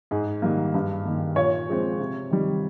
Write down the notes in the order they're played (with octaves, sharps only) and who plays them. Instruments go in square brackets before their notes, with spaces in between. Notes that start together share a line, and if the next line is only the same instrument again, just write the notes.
[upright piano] G#2 G#4
D#3 G3 A#3
G2
D#3 A#3
A#2 C#5
F3 G#3 C4
C3
D#3 G3